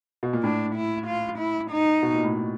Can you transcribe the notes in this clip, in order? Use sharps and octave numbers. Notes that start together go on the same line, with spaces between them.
B2
A#2
A2 D4
E4
F4
E4
D#4
B2
A#2
A2